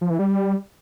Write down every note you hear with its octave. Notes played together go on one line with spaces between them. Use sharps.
F3
E3
G3